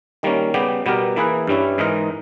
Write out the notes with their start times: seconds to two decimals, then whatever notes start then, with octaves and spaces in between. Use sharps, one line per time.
0.23 D#3 G3 A#3 C#4
0.54 C#3 G3 B3 G4
0.86 B2 G3 B3 G4 A#4
1.16 E3 A#3 E4 G#4 B4
1.47 G2 G3 C#4 E4
1.78 G#2 E3 G#3 D#4 A#4